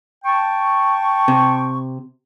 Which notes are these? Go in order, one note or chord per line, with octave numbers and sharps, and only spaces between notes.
G5 A5 C#6
C3